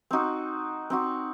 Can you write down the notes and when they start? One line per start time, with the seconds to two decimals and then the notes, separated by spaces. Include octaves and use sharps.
0.11 C4 D#4 F#4
0.90 C4 D#4 F#4